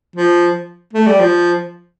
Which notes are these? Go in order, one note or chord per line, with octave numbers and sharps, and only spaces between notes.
F3
A3
G3
F3